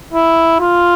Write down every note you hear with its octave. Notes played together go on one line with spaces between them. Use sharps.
E4
F4